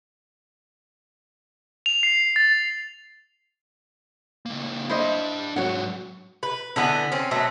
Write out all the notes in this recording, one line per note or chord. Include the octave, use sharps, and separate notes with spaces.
F7
C7
A6
C#2 A#3
D4 E4 C5 D#5 B5
G#2 F#3 F#4 C#5 F#5
B4
D3 E3 B3
C4 C#4
B2 F#3 A3 C4